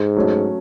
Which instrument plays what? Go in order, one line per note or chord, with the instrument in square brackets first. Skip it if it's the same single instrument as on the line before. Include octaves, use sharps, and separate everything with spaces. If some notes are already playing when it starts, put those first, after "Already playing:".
Already playing: [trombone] G#2
[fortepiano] F#3 A3 C#4